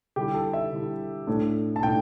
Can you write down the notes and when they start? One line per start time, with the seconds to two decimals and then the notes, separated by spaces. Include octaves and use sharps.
0.16 D3 G3 E4 G4
0.34 A4
0.53 E5
0.72 D3 G3 E4
1.27 A2 A3 D4
1.76 A5
1.83 A2 A3 D4 G5